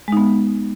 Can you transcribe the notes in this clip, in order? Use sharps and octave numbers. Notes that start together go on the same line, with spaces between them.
G#3 B3 D#4